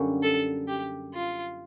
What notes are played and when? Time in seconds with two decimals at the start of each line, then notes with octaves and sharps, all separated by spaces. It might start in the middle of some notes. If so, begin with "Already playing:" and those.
Already playing: F#2 D3 G3 A#3 C#4
0.23 A4
0.68 G4
1.14 F4